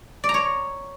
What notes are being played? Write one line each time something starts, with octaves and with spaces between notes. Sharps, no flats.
D5
A#5
C#5